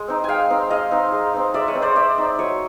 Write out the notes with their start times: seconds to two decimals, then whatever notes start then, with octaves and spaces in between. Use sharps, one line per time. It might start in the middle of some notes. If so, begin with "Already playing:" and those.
Already playing: G#3
0.08 C4 D#4
0.24 G#3 F5 G5 G#5
0.50 C4 D#4
0.70 G#3 D#5 F5
0.91 C4 D#4
1.12 G#3
1.34 C4 D#4
1.54 G#3 D5 E5
1.68 C#5 D#5
1.75 C4 D#4
1.82 C5 D5
1.95 G#3 D5 E5
2.18 C4 D#4
2.39 F#3 C#5 D#5